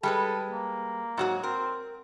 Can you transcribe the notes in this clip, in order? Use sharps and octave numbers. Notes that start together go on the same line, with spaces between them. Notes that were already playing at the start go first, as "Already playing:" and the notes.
G3 G#3 A4 B4
A#3
G#2 F#3 F#4
C4 A#4